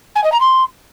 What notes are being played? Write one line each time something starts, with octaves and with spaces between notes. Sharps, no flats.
G#5
D#5
A#5
C6